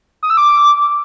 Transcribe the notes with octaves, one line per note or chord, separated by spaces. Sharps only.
D#6
E6
D6